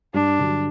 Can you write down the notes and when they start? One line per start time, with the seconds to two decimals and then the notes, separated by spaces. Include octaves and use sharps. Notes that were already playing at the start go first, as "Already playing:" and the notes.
0.14 G2 D4
0.39 D3 F#3